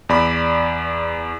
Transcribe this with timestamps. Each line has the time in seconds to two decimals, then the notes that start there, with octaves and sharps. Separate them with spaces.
0.09 E2 D5 B5